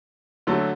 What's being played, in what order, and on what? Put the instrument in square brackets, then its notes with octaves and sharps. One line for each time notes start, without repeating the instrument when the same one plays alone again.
[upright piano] D3 F#3 A3